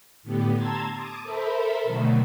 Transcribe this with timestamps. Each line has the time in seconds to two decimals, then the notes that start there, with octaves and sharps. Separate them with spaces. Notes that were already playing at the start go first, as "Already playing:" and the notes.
0.23 A2 D3 B3 G4
0.54 A5 A#5 C6 E6 G#6 A6
0.93 A5 D6 D#6
1.23 A4 A#4 C5 E5 B5
1.83 B2 D3 D#3 F#3 A3